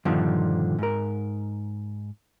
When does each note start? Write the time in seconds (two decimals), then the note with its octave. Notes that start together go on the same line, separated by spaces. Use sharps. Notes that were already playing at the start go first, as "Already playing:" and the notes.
0.05 G2 A#2 D3 D#3 F3
0.79 G#2 A#4